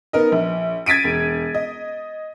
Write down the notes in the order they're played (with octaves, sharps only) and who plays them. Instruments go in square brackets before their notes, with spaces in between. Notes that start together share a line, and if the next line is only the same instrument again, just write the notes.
[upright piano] B3 D#4 A#4 D#5
A#1
G#6 A6 B6 D7 D#7
E1
D#5